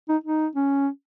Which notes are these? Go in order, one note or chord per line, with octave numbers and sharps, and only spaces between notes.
D#4
D#4
C#4